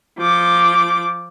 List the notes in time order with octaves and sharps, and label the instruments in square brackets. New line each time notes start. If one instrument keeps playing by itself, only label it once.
[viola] F3 D6